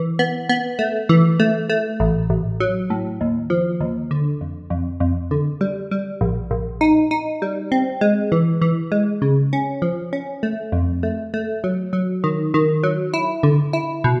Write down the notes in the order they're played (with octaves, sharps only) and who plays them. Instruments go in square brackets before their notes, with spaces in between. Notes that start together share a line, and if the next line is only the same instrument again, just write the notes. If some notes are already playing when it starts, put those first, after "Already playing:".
Already playing: [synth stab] E3
B3
B3
A3
E3
A3
A3
A1
A1
F#3
A2
D#2
F3
D#2
D3
F2
F2
F2
D3
G3
G3
A#1
A#1
D#4
D#4
G3
C4
G#3
E3
E3
G#3
C#3
C#4
F3
C#4
A3
F2
A3
A3
F#3
F#3
D#3
D#3
F#3
E4
D3
E4
B2